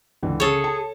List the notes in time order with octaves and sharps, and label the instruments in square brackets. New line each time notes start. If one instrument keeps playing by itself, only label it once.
[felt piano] C#2 D3 E3
[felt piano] C#3 [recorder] G#4 [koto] A4 C#5
[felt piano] A5